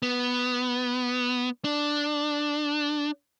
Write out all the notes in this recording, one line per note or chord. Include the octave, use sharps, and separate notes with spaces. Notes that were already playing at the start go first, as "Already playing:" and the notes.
B3
D4